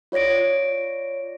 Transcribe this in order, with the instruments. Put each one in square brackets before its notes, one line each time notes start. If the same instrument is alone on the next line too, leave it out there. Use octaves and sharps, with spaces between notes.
[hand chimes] F4 C#5 D5 A#6 D7